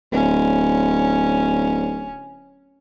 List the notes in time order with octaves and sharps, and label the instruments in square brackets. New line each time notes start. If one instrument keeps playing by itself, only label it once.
[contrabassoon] D1 [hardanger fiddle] C#4